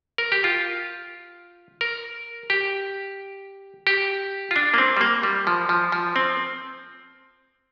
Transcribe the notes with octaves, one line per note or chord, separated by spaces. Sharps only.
A#4
G4
F4
A#4
G4
G4
F4
D4
A#3
C4
G3
A#3
G3
F3
F3
F3
C4